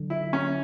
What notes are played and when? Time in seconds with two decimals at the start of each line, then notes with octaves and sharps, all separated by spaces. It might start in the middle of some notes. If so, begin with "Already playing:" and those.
Already playing: D3 F#3
0.10 E4
0.33 C#4